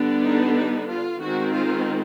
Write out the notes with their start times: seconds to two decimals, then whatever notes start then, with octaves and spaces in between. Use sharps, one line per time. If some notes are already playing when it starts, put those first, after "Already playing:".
Already playing: D3 G3 B3 D4
0.22 D#4
0.55 D#4
0.87 F4
1.20 D#3 G#3 C4 F#4
1.53 F4